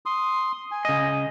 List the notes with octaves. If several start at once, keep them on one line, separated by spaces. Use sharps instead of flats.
C6 D#6
G#5
C#3 D#5